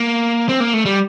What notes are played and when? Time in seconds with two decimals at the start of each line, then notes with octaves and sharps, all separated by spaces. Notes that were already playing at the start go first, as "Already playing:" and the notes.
Already playing: A#3
0.49 C4
0.60 A#3
0.73 A3
0.85 G3